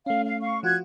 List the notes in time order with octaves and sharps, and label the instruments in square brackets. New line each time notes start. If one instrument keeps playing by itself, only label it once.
[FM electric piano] A3 C#4 [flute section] F5
[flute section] F5
F5 C#6
[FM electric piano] F3 F4 F#4 [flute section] F#6 G#6